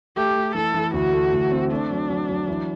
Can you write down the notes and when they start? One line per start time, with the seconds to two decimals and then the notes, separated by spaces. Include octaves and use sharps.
0.16 A3 G4
0.35 A3
0.55 E3 A4
0.74 E3
0.94 D2 F#4
1.13 A3
1.32 D2
1.51 C4
1.71 A3 D4
1.91 F#3
2.09 F#3
2.29 F#3
2.48 E3